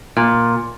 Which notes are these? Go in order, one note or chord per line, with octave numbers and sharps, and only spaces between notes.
A#2